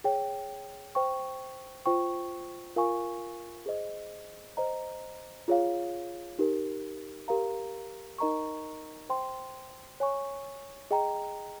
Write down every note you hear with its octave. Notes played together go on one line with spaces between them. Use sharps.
G#4 C#5 G5
C5 G5 C#6
F4 C5 G5 C#6
F4 A#4 F5 G#5 C#6
G#4 C5 D#5
C5 D#5 A#5
F4 G#4 C#5 F5
D#4 G4 A#4
G4 A#4 F5 A#5
D#4 A#4 D#5 A#5 C#6
C5 G5 C6
C#5 G#5 C#6
G#4 D#5 G5 A#5